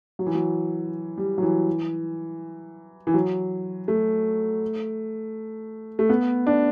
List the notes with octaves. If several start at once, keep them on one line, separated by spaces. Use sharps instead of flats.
F#3
E3
F#3
G3
F#3
E3
E3
F#3
A3
A3
B3
D4